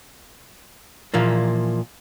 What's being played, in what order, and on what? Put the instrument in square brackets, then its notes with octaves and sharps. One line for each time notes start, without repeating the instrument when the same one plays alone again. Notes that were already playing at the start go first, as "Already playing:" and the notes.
[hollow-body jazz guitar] A#2 E3 F3 A#3